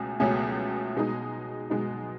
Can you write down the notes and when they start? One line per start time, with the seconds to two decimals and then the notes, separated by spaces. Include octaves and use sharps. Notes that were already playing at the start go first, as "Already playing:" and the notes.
Already playing: C#2 B2 A3 C#4 G#4
0.20 C#2 B2 A3 C#4 G#4
0.95 B2 G#3 D#4
1.70 B2 G#3 D#4